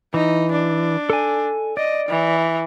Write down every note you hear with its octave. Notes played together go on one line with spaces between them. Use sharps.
E3 D#4
D4
A4 G#5
D5 D#5
E3